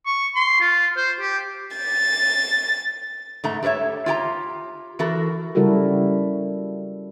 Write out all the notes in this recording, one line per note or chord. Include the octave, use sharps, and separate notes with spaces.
C#6
C6
F4
C5
G4
A6
G#2 A3 A#5
G4 A4 B4 C#5 E5
F4 G4 G5 A#5
E3 F#4 A4 A#4
C#3 G3 E4 F#4 A4 A#4